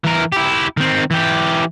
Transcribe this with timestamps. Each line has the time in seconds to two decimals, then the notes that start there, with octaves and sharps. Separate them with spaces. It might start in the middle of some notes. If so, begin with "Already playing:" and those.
0.04 E3 A#4
0.32 E4 G4
0.77 D#3 C4
1.11 E3 G4